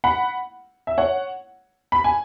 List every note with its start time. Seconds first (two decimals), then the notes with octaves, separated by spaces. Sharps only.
0.04 F#5 B5
0.87 E5
0.98 C#5 F#5
1.92 B5
2.04 G#5